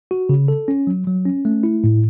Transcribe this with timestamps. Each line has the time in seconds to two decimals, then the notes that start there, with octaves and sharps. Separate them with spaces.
0.11 F#4
0.29 C#3
0.48 A4
0.68 C#4
0.87 F#3
1.07 F#3
1.25 C#4
1.45 A3
1.63 E4
1.84 A2